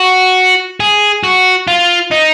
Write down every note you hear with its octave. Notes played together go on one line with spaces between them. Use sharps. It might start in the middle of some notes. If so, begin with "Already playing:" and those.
Already playing: F#4
G#4
F#4
F4
D#4